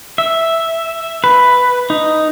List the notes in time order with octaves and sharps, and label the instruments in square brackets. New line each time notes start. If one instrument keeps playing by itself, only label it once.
[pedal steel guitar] E5
B4
D#4